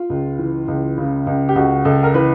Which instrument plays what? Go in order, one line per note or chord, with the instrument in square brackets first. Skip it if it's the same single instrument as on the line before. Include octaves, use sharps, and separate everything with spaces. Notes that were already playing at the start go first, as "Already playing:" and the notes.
Already playing: [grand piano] F4
C#2
E3
C#2
C#3
C#2
G4
C#2 F#4
C#2 A4
A#4
E3 B4